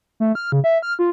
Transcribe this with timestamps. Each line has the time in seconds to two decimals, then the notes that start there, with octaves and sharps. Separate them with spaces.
0.20 A3
0.35 F6
0.52 C#3
0.64 E5
0.82 F6
0.99 F4